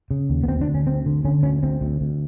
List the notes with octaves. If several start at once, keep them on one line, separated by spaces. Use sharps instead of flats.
C#3
D#2
B3
D2 C4
D4
D3
C#4
D2 C4
D3
D3 C#4
D2 C#4
D2 C4
D2
D2